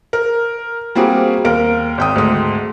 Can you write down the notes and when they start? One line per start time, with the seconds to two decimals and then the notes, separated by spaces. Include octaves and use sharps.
0.13 A#4
0.95 G3 A#3 C4 F#4 G#4
1.45 D#2 A#4 D7
1.98 G#1 G5 D#6
2.16 D2 G#2 D#6